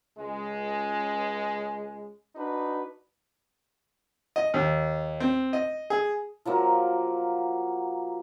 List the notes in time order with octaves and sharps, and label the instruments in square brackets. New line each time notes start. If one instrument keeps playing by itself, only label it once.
[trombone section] C#2 G#3
D4 D#4 F#4 B4
[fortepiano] D#5
D#2
C4
D#5
G#4
[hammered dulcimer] F3 F#3 A#3